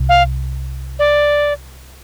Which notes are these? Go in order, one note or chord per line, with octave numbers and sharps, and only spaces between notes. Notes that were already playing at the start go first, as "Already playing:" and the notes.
Already playing: C2
F5
D5